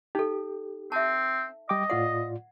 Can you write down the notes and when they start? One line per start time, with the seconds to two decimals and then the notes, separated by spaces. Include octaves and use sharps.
0.15 D#4 G4 A4
0.92 C4 E5 A5
1.69 G3 D#5 G5 D6
1.90 A2 F4 D5 F#5